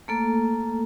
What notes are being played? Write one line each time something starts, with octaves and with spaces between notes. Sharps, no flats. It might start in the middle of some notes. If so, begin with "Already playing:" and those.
A3 A#3 A4